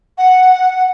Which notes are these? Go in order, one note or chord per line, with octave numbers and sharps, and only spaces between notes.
F#5